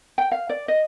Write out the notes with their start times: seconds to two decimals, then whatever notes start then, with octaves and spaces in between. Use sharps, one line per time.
0.18 G5
0.32 F5
0.50 D5
0.68 D#5